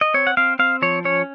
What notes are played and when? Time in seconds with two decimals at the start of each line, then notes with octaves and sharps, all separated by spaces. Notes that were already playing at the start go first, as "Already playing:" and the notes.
0.01 D#5
0.14 C4 C#5
0.27 F#5
0.37 C4 F5
0.59 C4 F5
0.82 F3 C#5
1.05 C#4 C#5